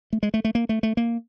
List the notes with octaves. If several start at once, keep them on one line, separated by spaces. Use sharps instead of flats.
A3
G#3
A3
A3
A#3
A3
A3
A#3